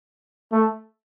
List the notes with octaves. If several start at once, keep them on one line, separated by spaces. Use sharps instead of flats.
A3